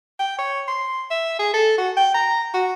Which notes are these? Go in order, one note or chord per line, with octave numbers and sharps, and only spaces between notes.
G5
C#5
C6
E5
G#4
A4
F#4
G5
A#5
F#4